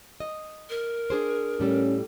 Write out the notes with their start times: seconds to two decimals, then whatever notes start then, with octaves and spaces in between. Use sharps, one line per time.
0.20 D#5
0.70 A#4
1.10 D4 G#4 C5
1.60 A2 G3 C#4 A4